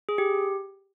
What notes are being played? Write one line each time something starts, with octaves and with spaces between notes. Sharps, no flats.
G#4
G4